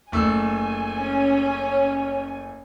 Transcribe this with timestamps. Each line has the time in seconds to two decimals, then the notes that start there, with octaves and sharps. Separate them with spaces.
0.12 F#1 A3 G#5 E6
0.98 C#4